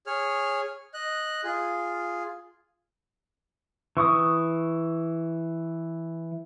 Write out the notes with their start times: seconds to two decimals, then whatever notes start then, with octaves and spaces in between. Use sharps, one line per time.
0.07 G#4 C#5 F6
0.94 D#5 F#6
1.44 F4 G#4
3.97 E3 C#6 D#6